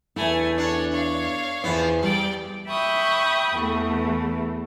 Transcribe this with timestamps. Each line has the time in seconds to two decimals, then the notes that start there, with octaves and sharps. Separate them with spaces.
0.16 E2 A3 E4 G#5
0.58 D4 C#5 F#5
0.92 C#5 F5
1.64 E2 F3 B3 E4
2.03 E2 G3 D5 G5
2.67 E5 G5 B5 C#6 D#6
3.55 E2 E3 A3